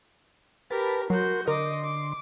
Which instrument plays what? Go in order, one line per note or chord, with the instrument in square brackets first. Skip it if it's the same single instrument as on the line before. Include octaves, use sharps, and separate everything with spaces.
[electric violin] G4 A#4 [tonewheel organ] B4 A5 B5
[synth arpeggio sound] F#3 [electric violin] F#4 G6 [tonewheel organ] A#4 C6
[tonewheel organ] D3 C6 [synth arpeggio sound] A#4 [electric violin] D#5 D6
[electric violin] D6